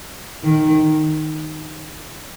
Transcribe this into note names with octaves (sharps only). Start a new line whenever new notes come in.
D#3